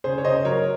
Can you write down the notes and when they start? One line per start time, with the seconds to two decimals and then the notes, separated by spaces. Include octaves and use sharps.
0.04 C#3 G#4 C5
0.18 C#5
0.25 C#3 C5 D#5
0.45 F#3 A#4 C#5